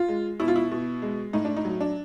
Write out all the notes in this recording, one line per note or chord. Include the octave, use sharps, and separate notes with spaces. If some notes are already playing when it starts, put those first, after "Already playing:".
Already playing: F4
G#3
B2 E4
F4
E4
B2
G#3
A2 D#4
D4
D#4
F#3
D4